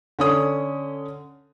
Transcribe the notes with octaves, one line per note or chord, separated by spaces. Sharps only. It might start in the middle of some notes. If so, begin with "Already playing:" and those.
D3 C#4 D#6